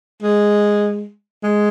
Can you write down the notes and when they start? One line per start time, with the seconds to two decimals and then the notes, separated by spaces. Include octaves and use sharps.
0.22 G#3
1.43 G#3